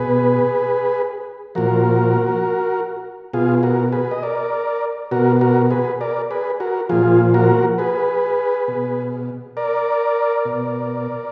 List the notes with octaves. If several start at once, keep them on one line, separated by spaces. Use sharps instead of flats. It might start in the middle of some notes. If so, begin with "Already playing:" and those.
Already playing: B2 G#4 B4
A#2 F3 F#4 A#4
B2 F4 G#4
F#4 A#4
G#4 B4
D#5
A#4 D5
B2 F#4 A#4
F#4 A#4
G#4 B4
A#4 D5
G#4 B4
F#4 A#4
A#2 F3 F4 G#4
F#4 A#4
G#4 B4
B2
A#4 D5
B2